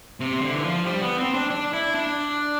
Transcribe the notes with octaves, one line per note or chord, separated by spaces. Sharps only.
C3
D3
E3
F3
G3
B3
C4
D4
D4
E4
D4